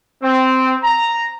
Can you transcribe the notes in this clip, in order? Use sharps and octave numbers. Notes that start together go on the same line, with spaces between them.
C4
A#5